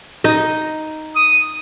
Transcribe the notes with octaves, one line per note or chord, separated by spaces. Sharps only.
D#4 D#5
D#6